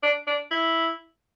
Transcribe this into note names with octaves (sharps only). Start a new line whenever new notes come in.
D4
D4
E4